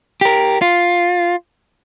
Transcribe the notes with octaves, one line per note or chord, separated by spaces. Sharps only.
G4 A#4
F4